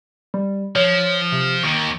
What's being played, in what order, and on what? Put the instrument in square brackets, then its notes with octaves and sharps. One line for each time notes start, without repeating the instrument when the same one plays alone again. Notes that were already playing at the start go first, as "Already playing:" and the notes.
[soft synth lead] G3
[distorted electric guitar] F3 [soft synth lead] C#5
[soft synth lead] C3
[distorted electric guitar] D#2 D#3 [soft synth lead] C#6